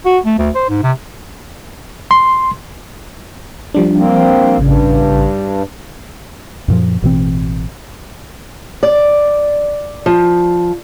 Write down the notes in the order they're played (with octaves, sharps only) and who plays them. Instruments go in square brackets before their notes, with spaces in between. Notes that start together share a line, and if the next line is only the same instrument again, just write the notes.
[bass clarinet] F#4
A3
D2
C5
G#2
C3
[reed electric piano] C6
[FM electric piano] F3 G3 D4
[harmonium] A#3 C4
[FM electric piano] A1 C#3 [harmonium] G2
[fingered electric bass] F#2 A#2 F3
A1 B2 E3 C4
[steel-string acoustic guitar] D5
F3